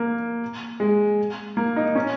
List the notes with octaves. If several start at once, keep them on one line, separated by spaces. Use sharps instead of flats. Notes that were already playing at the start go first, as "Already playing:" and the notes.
Already playing: A#3
G#3
A#3
D#4
C#4